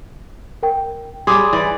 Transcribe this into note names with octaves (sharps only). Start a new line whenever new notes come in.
A#4 G5
G3 G#4 C6 D6
E3 D5